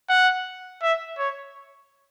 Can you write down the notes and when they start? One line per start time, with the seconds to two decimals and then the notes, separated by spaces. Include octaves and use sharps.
0.10 F#5
0.82 E5
1.18 C#5